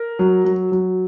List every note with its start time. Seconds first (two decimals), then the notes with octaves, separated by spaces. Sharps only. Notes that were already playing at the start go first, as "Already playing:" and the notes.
Already playing: A#4
0.19 F#3
0.45 F#3
0.72 F#3